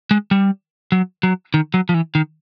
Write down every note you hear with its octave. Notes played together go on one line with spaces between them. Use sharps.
G#3
G3
F#3
F#3
D#3
F#3
F3
E3
D#3